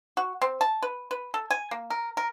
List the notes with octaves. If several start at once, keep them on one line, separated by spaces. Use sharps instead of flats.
F#4
C4
A5
B4
B4
A4
G#5
A#3
A#4
A#4